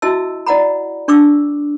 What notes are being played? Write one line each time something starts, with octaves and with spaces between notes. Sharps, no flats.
E4 F#4 D#5 E5 A5 E6
E4 D5 D#5 F#5 A#5 B5
D4 C#6 D6 E6